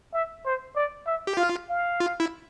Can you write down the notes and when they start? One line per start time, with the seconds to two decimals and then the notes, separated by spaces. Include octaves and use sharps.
0.13 E5
0.45 C5
0.76 D5
1.06 E5
1.27 G4
1.37 F4 F5
1.69 F5
2.00 F4
2.20 E4